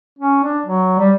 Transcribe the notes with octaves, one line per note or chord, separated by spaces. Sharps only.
C#4
D4
F#3
G3